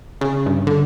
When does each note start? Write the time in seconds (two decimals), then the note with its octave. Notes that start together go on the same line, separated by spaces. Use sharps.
0.21 C#3
0.46 G2
0.67 D3